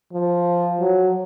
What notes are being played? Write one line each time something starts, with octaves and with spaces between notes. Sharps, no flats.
F3
F#3